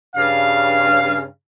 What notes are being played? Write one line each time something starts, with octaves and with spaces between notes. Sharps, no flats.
G2 C#3 F5